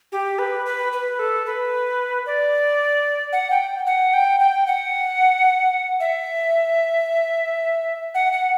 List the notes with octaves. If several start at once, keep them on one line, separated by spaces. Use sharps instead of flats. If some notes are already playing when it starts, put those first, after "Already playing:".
G4
B4
B4
B4
A4
B4
D5
F#5
G5
F#5
G5
G5
F#5
E5
F#5
F#5